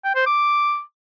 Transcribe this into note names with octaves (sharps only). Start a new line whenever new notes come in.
G5
C5
D6